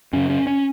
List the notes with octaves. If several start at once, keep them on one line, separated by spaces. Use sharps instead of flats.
F#2 C#3 C#4
C#4
C#4